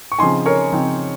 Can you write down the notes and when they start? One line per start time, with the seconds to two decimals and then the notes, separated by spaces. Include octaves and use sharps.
0.12 C#6
0.19 C#3 F3 C4 D#4 G#5 C6
0.46 A#4 C#5
0.72 C#3 F3 C4 D#4